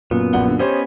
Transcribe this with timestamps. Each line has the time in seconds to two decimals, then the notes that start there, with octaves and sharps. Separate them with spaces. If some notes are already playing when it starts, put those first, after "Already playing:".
0.11 F#2 A#2 B3
0.33 A#1 F#5 G7
0.48 D3
0.59 B3 C#4 G4 C5 C#5 D#5